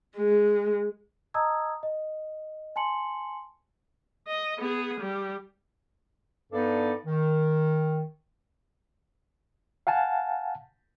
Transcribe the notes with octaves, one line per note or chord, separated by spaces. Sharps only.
G#3
D#5 A5 A#5 D#6 E6 G#6
D#5
G#5 A5 C6 C#7 F#7
D#5
B3 G#4
G3
G2 B3 D4 D#4 A4 D5
D#3
F5 F#5 G#5 A5